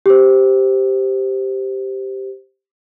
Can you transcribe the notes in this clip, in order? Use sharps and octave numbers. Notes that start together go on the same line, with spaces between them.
G4 C5